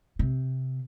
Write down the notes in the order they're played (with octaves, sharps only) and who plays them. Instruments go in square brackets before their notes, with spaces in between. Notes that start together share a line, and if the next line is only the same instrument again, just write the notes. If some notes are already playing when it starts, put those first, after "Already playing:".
[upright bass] C3